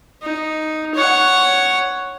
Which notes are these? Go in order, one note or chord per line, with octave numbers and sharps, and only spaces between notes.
D#4
C#5 F#5